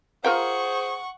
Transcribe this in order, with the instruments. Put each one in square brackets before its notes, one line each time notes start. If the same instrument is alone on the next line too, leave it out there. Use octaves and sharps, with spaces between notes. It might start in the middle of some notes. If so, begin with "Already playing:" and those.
[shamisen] F4 A#4 G5 [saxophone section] G#4 C5 [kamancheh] F#5 C#6